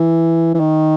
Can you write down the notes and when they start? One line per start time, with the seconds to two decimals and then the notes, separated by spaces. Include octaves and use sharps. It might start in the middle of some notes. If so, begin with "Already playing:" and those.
Already playing: E3
0.54 E3
0.59 D#3